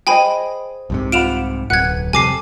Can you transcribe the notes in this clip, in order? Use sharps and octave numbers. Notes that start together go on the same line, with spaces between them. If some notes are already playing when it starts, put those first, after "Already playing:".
G#4 C5 D#5 G5 G#5 B5
C2 G#2 C3
F4 F#5 B5 D7 E7 F7
D1 B1 B4 F#5 G#6
F2 C3 G3 A4 G#5 D6 C7